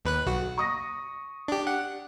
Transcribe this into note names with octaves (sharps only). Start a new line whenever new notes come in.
D#2 B4 F#6
B1 F#4
C#6 D#6 A#6
D4 G4
F#5